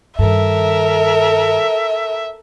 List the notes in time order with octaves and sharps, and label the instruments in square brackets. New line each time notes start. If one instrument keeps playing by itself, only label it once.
[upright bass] G2 D#3 [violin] A4 A#4 [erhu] E5